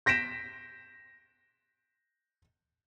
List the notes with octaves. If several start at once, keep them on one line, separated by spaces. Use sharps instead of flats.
G6 A#6 B6 D7 E7